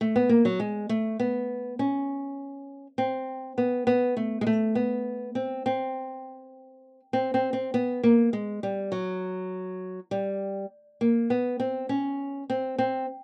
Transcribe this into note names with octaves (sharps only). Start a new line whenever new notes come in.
A3
B3
A#3
F#3
G#3
A3
B3
C#4
C4
B3
B3
A3
G#3
A3
B3
C4
C4
C4
C4
C4
B3
A#3
G#3
G3
F#3
G3
A#3
B3
C4
C#4
C4
C4